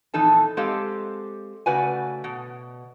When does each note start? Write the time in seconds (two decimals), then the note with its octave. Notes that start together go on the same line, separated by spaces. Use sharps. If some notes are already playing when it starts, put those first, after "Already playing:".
0.14 F2 A#2 E3 D#4 A4 A5
0.57 G#3 C4 G4 A4 D#5 F5
1.66 C#3 A3 F#4 B4 D5 G#5
2.24 B2